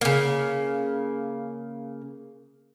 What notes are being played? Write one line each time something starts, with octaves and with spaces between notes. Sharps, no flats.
C#3 A#3